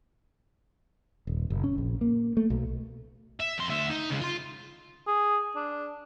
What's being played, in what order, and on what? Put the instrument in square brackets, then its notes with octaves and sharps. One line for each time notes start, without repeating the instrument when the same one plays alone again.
[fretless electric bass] D#1
F#1
C#4
A#1
A#3
A3
B1
[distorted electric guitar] E5
F2 C6
D2 E5
D#4
C#3 G#3
F4 C6
[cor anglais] G#4
D4